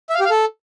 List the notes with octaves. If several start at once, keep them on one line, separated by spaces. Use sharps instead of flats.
E5
F5
G4
F5
A4